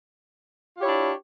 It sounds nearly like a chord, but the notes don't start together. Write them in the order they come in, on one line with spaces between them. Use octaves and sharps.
F4 G4 C#5 E4 D4